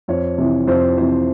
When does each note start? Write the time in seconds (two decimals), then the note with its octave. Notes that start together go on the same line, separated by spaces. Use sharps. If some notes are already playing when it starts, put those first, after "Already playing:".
0.08 F2 C#5
0.38 C3 E3
0.67 F2 C5
0.97 C3 E3 C5